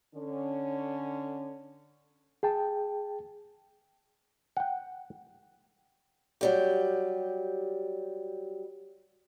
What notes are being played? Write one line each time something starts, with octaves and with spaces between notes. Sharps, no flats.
D3 C#4
G#4 G5 A5
F#5 G5
F#3 G3 G4